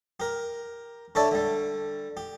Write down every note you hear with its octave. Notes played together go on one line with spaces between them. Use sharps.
G4 A#4
D3 A4 C#5 D5 E5 A5
D3 G3
G4